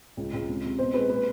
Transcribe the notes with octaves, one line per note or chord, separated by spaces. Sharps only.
C#2
C#2
C3
C3
B2 C5
G#3 B4
A#2 B4